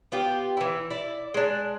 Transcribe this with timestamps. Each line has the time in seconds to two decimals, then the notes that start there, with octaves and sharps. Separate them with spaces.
0.12 B3 F4 G4
0.57 E3 E4
0.90 E4 D5
1.34 G#3 D4